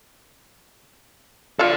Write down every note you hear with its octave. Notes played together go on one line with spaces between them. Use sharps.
F4 A4 D5 E5 F5